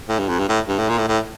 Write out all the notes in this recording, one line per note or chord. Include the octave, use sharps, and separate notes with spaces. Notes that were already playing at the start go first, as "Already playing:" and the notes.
A2
G2
F2
G2
A2
G2
A2
A#2
A2
A2